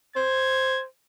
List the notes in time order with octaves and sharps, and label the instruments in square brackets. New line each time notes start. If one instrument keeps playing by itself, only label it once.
[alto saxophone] C5 [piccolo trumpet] G#6